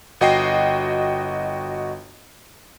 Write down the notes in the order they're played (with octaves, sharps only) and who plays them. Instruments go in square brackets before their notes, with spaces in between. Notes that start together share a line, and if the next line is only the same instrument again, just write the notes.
[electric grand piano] G1 F#4 D#5 G5 C7